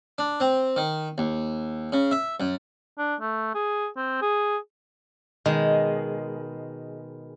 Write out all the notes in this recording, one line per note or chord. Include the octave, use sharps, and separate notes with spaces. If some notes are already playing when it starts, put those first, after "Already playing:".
D4
C4
D#3
D#2
C#3
E5
F#2
D4
A3
G#4
C4
G#4
B2 D#3 G#3